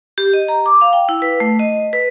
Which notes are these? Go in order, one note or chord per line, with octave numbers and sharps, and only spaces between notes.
G4
D#5
A#5
D6
F5
G5
E4
B4
A3
D#5
B4